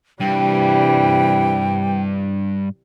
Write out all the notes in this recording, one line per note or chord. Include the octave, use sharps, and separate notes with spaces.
G2 C3 E3 G3 G5